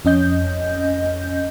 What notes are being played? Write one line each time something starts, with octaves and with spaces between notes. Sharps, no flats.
F2 C#4 D#5 G6